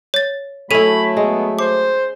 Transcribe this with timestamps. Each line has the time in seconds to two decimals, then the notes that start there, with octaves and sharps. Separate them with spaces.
0.14 C#5 A6
0.71 F#3 A3 C#4 E4 A4 B5 D#7
1.17 G#3 B3
1.59 C5 D6